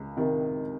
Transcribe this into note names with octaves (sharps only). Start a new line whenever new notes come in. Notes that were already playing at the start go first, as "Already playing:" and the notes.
Already playing: C#2
C3 D#3